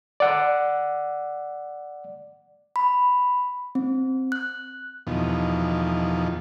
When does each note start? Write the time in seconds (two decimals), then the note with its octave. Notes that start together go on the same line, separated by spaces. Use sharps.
0.20 D5 F#5
2.76 B5
3.75 C4
4.32 F#6
5.07 E2 B2 D#3 F3